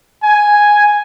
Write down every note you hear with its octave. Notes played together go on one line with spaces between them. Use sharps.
G#5